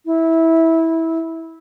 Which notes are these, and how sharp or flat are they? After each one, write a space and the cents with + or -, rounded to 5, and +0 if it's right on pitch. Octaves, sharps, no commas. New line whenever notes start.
E4 -15